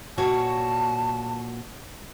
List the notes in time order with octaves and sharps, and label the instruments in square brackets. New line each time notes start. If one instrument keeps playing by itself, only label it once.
[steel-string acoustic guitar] A#2 F#4 C#5 [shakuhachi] A5